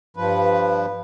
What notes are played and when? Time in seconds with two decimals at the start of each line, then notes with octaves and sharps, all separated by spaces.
0.17 G2 F3 B4